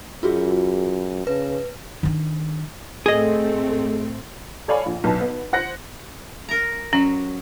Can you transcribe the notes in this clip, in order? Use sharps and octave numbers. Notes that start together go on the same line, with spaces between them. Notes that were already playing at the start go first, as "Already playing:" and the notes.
F#2 F4 F#4 G#4
C#3 B4
D#3 D4
A2 A3 C4 G#4 D#5
A4 C#5 D5 F5 G#5 B5
A#1
B1 B3 B4 A5
B3
C5 F#5 F#6 A#6
A#4 A#5
F#3 C#4